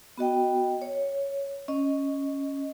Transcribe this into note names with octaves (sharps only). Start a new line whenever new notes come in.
B3 F#4 D#5 G5
C#5
C#4 D#5